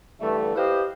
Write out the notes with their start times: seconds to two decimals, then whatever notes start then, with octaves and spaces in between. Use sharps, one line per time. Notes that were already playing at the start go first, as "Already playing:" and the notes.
0.21 G2 D3 E3 A3
0.56 E4 G4 B4 C5 D#5 F5